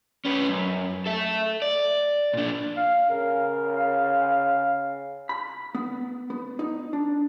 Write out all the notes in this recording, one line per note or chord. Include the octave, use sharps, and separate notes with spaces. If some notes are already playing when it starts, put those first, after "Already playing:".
C#4 B4
F#2
A4 E5
D5
A#2 D4
F5
C#3 A#4
F5
B5
B3
B3
D#4
D4